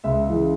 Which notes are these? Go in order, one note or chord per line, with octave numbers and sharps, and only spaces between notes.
C#2 E5
C#3 E3